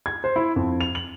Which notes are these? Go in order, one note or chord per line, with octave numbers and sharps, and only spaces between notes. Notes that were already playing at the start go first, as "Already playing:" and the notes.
G#6
C5
E4
F2
F7
F#7